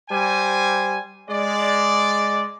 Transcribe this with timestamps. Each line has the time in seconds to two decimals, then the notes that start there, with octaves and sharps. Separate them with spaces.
0.10 G3 C5 G#5
1.29 G#3 D5